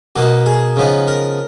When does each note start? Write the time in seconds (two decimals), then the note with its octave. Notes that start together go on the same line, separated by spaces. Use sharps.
0.16 B2 A#3 D#4 F#4
0.46 G#4
0.76 C#3 F3 B3 D#4
1.08 A#4